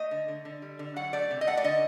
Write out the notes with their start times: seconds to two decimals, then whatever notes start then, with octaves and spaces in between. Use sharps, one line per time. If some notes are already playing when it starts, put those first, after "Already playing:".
Already playing: A3 D#5
0.11 D3
0.28 D3
0.45 D3
0.62 G3
0.79 D3
0.96 F#3 F#5
1.13 A3 D5
1.31 C3
1.41 D#5
1.47 A3 F#5
1.57 D5
1.64 D3 D#5